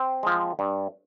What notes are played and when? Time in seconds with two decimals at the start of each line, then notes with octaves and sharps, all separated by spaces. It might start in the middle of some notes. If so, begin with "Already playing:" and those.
Already playing: C4
0.23 F3 G#3
0.59 G2